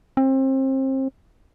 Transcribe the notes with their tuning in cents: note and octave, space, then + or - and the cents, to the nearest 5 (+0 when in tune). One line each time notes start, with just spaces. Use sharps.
C4 +30